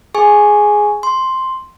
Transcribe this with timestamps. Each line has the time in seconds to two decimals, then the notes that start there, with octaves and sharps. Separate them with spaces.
0.15 G#4 G#5 C#6
1.03 C6